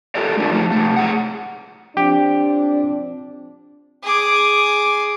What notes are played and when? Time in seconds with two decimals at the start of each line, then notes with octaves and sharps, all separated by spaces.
0.15 F4 G4 A4 A#4 C#5 D5
0.37 G#3 D4 F4
0.51 F3 A3 D#4
0.71 C3 A3
0.96 A2 G#4 F#5
1.97 F3 C4 D4 G4
4.03 G#4 D6